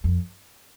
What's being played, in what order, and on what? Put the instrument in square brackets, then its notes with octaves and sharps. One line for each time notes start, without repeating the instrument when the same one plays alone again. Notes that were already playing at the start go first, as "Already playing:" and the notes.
[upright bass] F2